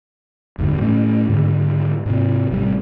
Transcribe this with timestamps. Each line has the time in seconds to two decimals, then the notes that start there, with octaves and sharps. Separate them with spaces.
0.58 F#1 E2 G#2 D3
0.81 A2 A3 C#4
1.29 G#2 D3 D#3 G#3
2.06 G#2 C3
2.50 A1 C3 F3 G3